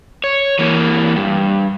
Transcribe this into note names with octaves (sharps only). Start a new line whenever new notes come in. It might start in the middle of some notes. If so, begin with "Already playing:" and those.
C#5
E3 A#3
G2